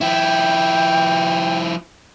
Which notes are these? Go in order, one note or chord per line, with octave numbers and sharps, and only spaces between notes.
F3 E4 G5